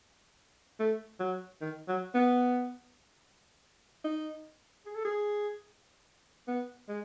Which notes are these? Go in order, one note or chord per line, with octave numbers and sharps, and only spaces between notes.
A3
F#3
D#3
F#3
B3
D#4
G#4
A4
G#4
B3
G#3